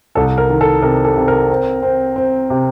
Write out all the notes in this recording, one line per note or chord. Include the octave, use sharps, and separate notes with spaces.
C2 A4
A#4
D#3
A4
C3 A#4
A4
C3
A#4
C4
C4
C4
C3